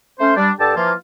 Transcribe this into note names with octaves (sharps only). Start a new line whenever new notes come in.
A3 C#4 C5
G3 D4
G2 D3 G4 A4 G5 A5
E3 F3 A#3 F4